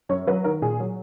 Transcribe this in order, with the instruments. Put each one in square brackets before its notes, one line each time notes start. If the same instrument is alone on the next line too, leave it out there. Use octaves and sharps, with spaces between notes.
[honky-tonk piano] F#2 C#5
F#3 B4
D#3 A#4
A#2 G#4
F#3